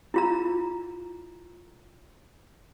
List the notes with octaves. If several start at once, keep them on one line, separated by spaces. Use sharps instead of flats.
E4 F4 A#5